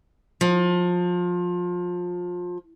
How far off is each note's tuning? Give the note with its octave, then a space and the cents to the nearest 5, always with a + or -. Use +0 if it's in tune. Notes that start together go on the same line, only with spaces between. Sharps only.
F3 +25